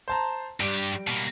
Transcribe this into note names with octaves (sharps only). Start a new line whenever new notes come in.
C5 A5 A#5
G2 G3 G4 D7
B2 A#3